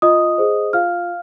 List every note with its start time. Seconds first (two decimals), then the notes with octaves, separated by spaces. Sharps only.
0.02 F4 D#5 D#6
0.38 G#4 C5
0.73 F4 F5 F6